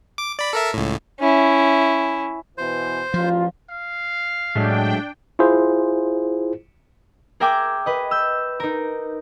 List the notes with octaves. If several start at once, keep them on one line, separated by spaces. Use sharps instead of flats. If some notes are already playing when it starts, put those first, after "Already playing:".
D6
D5 B5
A4 A#4 E5
C#2 A2
C#4 E4
B2 E3 C5
A1 F3 F4
F5
A2 F#3 G#3 A3 D4 G5
E4 F4 G#4 C5
G#4 A#4 E5 G5 G#5 D6
B4 D#5
E6 G6
D#4 A#4